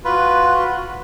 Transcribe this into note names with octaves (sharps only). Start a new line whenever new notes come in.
F4 F#4 B4